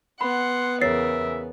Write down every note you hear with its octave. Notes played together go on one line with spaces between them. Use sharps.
B3 F#5 B5 C6
E2 C#3 A#4 C#5 E5 A6 C7